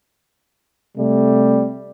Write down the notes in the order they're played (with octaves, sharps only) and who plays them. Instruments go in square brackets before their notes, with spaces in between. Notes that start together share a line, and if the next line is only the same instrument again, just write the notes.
[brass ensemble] C3 G3 A3